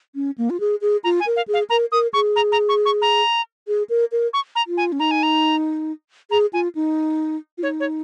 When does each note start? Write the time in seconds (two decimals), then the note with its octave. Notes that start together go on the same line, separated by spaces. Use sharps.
0.15 C#4
0.38 A#3
0.50 F4
0.60 G#4
0.81 G#4
1.04 F4 A#5
1.20 G#5
1.26 A#4
1.36 F5
1.48 G#4
1.54 F5
1.70 A#4 A#5
1.92 A#4 D#6
2.13 G#4 C#6
2.36 A#5
2.52 A#5
2.69 C#6
2.85 C#6
3.02 A#5
3.68 G#4
3.89 A#4
4.12 A#4
4.33 C#6
4.55 A#5
4.67 F4
4.77 G#5
4.92 C#4
5.00 D#4 A#5
5.11 G#5
5.23 A#5
6.31 G#4 A#5
6.53 F4 G#5
6.75 D#4
7.58 F4
7.63 D#4 C#5
7.80 C#5